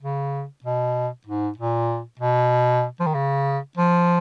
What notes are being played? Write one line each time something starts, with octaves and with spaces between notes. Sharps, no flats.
C#3
B2
G#2
A#2
B2
F3
D#3
C#3
F3